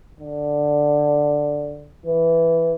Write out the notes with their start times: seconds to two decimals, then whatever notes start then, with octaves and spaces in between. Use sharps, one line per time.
0.20 D3
2.06 E3